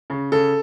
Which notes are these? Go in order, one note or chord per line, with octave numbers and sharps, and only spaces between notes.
C#3
C#3 A4